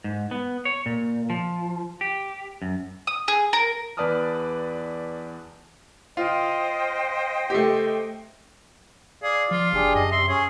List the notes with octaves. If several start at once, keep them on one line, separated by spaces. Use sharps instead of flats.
G#2
B3
C#5
A#2
F3
G4
F#2
D#6
G#4
A#4
E2 B4 D5 A5 D#6 F6
F4 C5 D#5 G5
A3 G4
G#4 D5 F5
F3 F4
F#1 D4 G4 G#4
F#2 D#5
C3 E5 C6
C#4 G#4 C#5